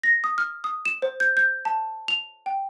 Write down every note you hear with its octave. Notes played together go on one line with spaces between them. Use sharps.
A#6
D#6
F6
D#6
E7
C5
G6
G6
A5
F7
G5